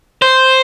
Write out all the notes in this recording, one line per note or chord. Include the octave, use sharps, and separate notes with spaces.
C5